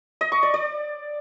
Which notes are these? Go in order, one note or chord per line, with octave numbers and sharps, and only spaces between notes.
D#5
C#6
D5
D5